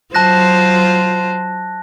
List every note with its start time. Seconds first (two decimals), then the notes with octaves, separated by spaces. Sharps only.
0.14 F#3 F4 C5 A5 F#6 A#6